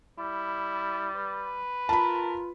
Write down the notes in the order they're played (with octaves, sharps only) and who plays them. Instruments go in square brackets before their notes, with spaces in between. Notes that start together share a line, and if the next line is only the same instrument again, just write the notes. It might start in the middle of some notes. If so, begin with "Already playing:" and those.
[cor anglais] G3 [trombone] E4
[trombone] B4
[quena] F4 [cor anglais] A#4 [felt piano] A5 B5